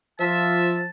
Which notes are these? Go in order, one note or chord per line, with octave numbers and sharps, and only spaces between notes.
F3 E5 A5